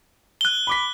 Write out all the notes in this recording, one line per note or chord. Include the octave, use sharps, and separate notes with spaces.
F#6 G7
B5 D6 B6